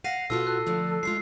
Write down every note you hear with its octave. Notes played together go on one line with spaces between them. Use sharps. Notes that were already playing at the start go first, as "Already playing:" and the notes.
F5 F#5 A#6 C7 D#7
B2 F4 F#4 A4 E6
A4 F#6
D3 F3 A3
G#3 A3 F4 C7